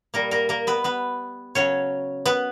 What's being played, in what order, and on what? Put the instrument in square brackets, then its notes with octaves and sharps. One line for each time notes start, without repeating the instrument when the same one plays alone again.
[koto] A#2 G3 A#3 A#4
A#3 A#4
A#3 A#4
B3 B4
B3 B4
C#3 F#3 C#4 C#5
B3 B4